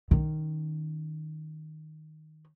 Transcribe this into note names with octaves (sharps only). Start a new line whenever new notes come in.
D#3 C#4